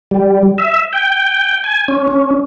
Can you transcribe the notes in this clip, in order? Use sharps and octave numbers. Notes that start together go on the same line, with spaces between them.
G3
E5
G5
G#5
C#4
C#4